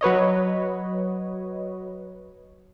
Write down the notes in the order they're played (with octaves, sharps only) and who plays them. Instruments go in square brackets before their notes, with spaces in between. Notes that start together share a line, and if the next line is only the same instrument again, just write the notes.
[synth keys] F#3 B4 C#5 D#5